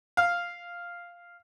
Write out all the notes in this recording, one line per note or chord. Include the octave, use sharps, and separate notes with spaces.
F5